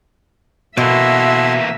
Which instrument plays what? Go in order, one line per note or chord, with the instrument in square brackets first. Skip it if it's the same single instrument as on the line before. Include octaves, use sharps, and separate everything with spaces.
[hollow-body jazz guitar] B2 [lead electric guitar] E3 A#3 [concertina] A4 F#5 C6 [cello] E5